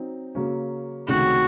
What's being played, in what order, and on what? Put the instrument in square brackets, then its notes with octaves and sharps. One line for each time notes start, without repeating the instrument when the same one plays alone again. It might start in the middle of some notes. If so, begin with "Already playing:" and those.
Already playing: [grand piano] F#3 C4 D#4
C#3 F#3 A#3 C#4
[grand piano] C#2 C3 D#3 F#3 A3 [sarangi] F#4